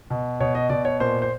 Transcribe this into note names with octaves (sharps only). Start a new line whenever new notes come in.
B2
B2 C#5
D#5
B2 D5
C#5
A#2 C5
C5